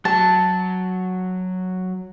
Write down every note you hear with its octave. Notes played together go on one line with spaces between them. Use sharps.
F#3 A5